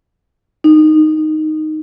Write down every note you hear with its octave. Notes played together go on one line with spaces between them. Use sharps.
D#4